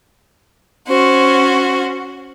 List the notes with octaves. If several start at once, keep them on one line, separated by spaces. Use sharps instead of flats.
C#4 F#4 C5